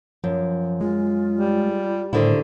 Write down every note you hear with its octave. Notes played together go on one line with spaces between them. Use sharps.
F#2 F3
G#3 F4
G3
A2 D3 D#3 G3 E4 C5